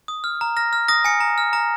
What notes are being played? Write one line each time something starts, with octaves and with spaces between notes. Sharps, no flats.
D#6
F6
A#5
F6 A#6
F6
D#6 A#6
G#5 C#7
A#5
F6
A#5